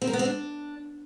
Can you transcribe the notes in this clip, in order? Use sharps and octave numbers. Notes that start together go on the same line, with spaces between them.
C4
A#4
B3
C4
D4